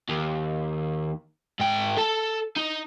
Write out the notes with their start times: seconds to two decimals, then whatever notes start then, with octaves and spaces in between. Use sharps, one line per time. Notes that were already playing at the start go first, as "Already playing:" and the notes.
0.09 D#2
1.60 G#2 G5
1.97 A4 A5
2.56 D#4